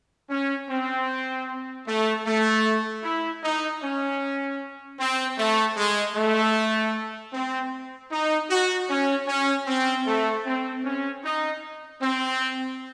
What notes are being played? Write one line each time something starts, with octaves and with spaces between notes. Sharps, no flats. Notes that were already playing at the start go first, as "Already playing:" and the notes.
C#4
C4
A3
A3
E4
D#4
C#4
C4
A3
G#3
A3
C4
D#4
F#4
C#4
C#4
C4
A3
C4
C#4
D#4
C4